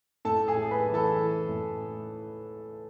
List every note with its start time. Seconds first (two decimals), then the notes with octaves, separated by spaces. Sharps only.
0.25 A2 A4 A5
0.48 G#4 G#5
0.55 A2
0.71 B4 B5
0.87 E3
0.94 A4 A5
1.17 E3
1.49 A2